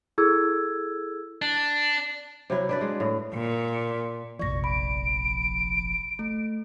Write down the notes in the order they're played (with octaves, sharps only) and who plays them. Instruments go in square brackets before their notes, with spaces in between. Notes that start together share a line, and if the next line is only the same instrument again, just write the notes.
[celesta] E4 G#4 A4 E6 G#6
[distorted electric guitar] D4
[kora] C3 F#3 E4
D4 B4 D5
G#3
A2
[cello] A#2
[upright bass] F1 A#1 [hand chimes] D5 A#6 [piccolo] C#6
[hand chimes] B5 [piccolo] D7
[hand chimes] A3